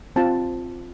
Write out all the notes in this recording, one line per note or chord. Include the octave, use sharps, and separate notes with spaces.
C4 F4 A5